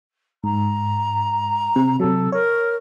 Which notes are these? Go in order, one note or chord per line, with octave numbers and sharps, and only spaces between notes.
G#2 A#5
C3
C3 F#3 A4
A#4 C#5